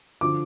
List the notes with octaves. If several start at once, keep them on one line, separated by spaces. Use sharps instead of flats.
D3 F3 D6